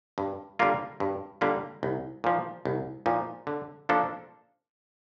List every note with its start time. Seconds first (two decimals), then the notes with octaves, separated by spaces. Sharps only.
0.18 G2
0.59 D3 G3 A#3 F4
1.00 G2
1.41 D3 G3 A#3 F4
1.83 C2
2.24 A#2 F3
2.65 C2
3.06 A#2 F3
3.47 D3
3.89 F3 A#3 D4 A4